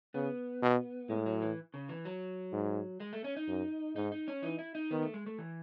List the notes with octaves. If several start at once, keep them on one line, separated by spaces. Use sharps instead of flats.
C#3 B3
B2
A2 G#3
F#3
E3
C#3
E3
F#3
G#2
G#3
A3
C#4
D#4
F#2
G#2 D#4
D#4
C#4
E3 D#4
E4
D#4
D#3 B3
A3
G#3
A3
E3